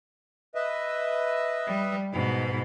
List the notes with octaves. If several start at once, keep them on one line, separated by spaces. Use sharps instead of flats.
B4 D#5 E5
G3
G#2 B2 B5